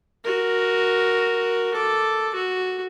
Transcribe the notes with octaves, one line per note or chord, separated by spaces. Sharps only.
F#4 A#4
A4 D6
F#4